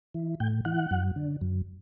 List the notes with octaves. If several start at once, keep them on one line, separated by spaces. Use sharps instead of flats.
E3
A2 G5
E3 F#5
F#2
D3
F#2